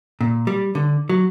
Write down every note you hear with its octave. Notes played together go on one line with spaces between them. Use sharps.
A#2
G3
D3
F#3